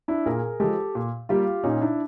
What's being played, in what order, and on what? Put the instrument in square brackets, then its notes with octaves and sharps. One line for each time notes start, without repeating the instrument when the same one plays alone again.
[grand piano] D4 E4
A#2 G#4 A#4
F3 G#3 G4 A4
A#2
G3 A#3 F4 G4
A#2 C#4 D#4
D4 E4